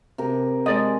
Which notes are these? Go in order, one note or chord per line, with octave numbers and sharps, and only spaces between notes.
C3 A#4
G#3 D5 D#5